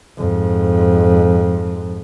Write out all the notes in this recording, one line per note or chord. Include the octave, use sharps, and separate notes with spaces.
F2 G#2